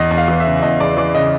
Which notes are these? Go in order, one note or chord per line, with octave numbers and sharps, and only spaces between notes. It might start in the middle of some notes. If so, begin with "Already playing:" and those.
Already playing: E2 D#5
E2
F5
E3
E5
C#3
E2 D#5
E2 D5
E3 D5
C#3 D#5